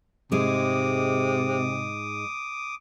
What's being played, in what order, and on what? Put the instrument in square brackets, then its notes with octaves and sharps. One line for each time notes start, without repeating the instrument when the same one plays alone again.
[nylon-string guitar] G#2 G#3 [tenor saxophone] C3 [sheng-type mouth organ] D6 D#6